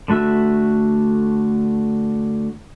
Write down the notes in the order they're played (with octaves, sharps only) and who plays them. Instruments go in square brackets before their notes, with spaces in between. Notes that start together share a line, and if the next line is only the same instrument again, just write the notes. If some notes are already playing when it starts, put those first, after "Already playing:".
[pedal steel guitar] D3 A3 F#4 E5 E6